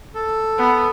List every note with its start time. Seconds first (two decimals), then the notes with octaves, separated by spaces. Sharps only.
0.15 A4
0.58 B3